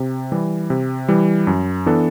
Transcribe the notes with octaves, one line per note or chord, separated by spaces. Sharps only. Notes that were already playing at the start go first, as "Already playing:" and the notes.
Already playing: C3
E3 G3
C3
E3 G3
F#2
E3 B3 D4 A4